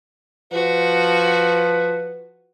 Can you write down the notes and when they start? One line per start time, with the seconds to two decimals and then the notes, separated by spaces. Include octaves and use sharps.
0.52 F3 F#4 B4